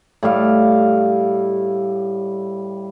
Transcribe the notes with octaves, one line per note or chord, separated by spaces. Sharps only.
A2 G3 F5